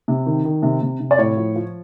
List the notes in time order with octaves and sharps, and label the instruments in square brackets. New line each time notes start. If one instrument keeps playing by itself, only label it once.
[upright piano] C3
D#3
D#3
C3
C3
C3
D5
A2 C#5
F3
F3